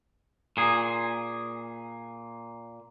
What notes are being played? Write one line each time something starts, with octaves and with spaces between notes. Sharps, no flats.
A#2 G#4